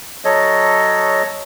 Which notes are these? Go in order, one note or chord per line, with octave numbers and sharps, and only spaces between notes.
F#3 A4 C#5 D#5